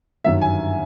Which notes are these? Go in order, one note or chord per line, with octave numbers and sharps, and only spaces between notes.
G1 F#2 D#3 E5
G#5